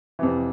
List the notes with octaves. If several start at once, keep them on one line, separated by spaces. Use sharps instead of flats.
F2 C3 E3